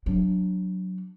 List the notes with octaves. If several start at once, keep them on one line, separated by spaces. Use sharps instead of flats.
F#3 D4